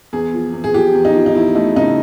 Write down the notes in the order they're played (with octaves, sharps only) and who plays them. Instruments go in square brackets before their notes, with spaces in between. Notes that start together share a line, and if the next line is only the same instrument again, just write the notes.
[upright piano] E2 G#4
F3
E2
G#4
F3 G4
E2
D#4
F3
D#4
E2 E4
A3 D#4
C#3 D#4